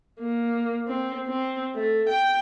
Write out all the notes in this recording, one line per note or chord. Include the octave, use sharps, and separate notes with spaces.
A#3
C4
C4
A3
G5